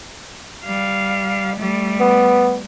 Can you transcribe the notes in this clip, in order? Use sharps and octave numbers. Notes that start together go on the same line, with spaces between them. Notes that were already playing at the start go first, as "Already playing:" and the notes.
G3 F5
G3 A3
B3